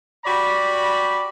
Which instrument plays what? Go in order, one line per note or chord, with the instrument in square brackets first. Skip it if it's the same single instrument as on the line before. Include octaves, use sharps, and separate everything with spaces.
[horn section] F#4 G4 D5 B5